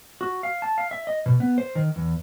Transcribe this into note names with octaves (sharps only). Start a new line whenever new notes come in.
F#4
F5
A5
F5
E5
D#5
B2
B3
C5
D#3
E2